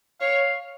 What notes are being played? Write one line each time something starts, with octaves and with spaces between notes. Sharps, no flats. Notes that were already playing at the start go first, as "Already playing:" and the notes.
C#5 F5